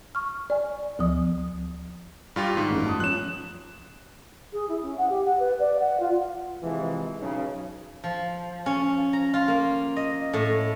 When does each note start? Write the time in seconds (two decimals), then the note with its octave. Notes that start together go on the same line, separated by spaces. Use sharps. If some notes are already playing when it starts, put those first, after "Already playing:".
0.15 C#6 F6
0.50 D5 G#5
0.99 D2 F3 D#6
2.36 G2 F4 G4
2.57 G#2 D#3
2.70 A1 F#2
2.86 A5 D#6
3.00 F3 C#4 F#6 E7
4.53 G#4
4.69 E4
4.82 C#4
4.98 F#5
5.10 G4
5.25 F#5
5.39 B4
5.60 D5
5.79 F#5
6.00 F4
6.62 C3 E3 F3 G#3
7.19 B1 C#3
8.04 F3
8.66 C#4
9.13 A#5
9.34 F4
9.48 A#3
9.96 D#5
10.33 A2